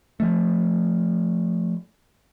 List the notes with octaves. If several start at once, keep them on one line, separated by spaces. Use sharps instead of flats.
F3 A3